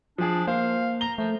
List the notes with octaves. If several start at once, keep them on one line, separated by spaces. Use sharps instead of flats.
F3 D4 G#4
A#3 C5 F5
A#5 G7
F3 A3